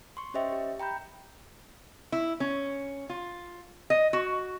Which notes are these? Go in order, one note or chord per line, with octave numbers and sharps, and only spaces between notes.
C6 C#6
C#4 G4 C5 D#5 E5 G5
G4
G5 A#5 B5 G6
E4
C#4
F4
D#5
F#4